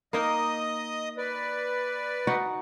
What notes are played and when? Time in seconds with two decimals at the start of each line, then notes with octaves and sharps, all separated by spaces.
0.13 A#3 D#4 A#4 D#5 D#6
1.18 B4 D5
2.27 D#4 F#4 F#5